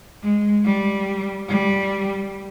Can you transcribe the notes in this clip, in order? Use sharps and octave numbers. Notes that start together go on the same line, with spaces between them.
G#3
G3
G3